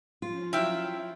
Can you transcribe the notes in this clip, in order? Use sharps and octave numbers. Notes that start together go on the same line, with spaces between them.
F3 C#4 F4
F#3 E4 E5 F5 G5